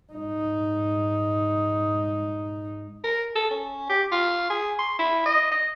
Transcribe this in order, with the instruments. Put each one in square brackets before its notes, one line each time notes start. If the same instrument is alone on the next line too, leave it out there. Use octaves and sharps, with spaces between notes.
[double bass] G#2 D#4
[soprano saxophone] A#4
A4
C#4
G4
F4
G#4
C6
E4
D#5
D#5